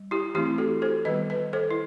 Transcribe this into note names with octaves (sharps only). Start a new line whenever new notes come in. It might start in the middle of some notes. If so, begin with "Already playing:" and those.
Already playing: G3
E4 G4
E3 A3 C4 E4 G4
F#4 A4
A4 C5
D#3 G3 B3 B4 D#5
B4 D#5
A4 C5
E4